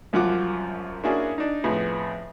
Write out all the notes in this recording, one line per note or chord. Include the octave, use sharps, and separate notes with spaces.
C2 F#2 F3 F4 F#5 D6
A#3 C#4 D4 E4 F#4 G#4
D4 D#4
F2 A2 B3 G#4